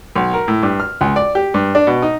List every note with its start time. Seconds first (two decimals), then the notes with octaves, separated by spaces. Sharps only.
0.16 B1
0.34 A#4
0.48 A2
0.63 G2
0.80 F6
1.01 C#2
1.16 D5
1.35 G4
1.54 G2
1.75 D4
1.87 B2
2.02 D#4